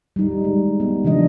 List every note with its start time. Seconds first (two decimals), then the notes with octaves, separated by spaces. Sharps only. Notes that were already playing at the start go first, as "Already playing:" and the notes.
0.16 G3 D#4
0.44 G#3
0.80 B3
1.04 C#3 E3 F3 D4 D#5